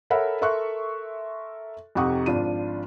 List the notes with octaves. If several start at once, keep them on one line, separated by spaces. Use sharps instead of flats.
A4 A#4 C#5 E5 F#5 B5
A4 A#4 E5 C6 C#6 F#6
F2 C3 D#4 F#5 C#6 D#6
G#1 F3 D4 F4 D#7